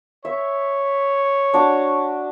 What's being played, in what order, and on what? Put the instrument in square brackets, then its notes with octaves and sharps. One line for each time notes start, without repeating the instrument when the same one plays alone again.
[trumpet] C#5 [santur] E5
[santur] D4 F#4 D6